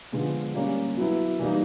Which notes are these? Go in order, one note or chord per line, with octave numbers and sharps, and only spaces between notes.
D3 F3 G#3 B3
G3 A#3 C#4
F#3 B3 E4
E3 G3 A#3 D#4